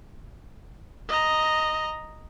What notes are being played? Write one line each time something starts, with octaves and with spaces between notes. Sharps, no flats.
D#5 A#5